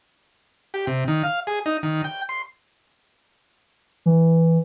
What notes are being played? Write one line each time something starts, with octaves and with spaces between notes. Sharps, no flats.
G4
C3
D#3
F5
G#4
D#4
D#3
G5
C6
E3